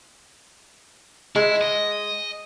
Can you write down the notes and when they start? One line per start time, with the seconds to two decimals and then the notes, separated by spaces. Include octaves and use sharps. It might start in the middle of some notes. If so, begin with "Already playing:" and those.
1.36 G#3 E4
1.61 D#5